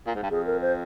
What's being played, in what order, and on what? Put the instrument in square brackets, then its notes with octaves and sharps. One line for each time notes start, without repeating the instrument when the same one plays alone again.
[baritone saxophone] A#2
G#2
G2
[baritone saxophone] F2 [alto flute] G#4
[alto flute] A#4
C5